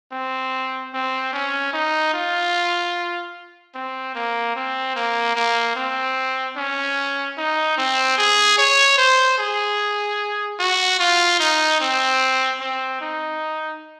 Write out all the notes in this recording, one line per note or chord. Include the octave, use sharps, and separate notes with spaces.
C4
C4
C#4
D#4
F4
C4
A#3
C4
A#3
A#3
C4
C#4
D#4
C4
G#4
C#5
C5
G#4
F#4
F4
D#4
C4
C4
D#4